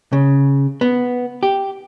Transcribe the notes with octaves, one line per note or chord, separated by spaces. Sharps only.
C#3
B3
G4